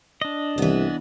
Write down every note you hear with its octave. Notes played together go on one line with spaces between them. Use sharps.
D4 D#5
C2 E3 B3